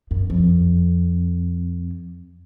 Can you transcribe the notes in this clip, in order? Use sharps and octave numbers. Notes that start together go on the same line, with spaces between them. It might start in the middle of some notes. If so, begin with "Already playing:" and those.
F#2
F2